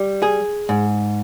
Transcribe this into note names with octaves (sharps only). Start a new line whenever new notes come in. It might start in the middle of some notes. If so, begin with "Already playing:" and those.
Already playing: G3
G#4
G#2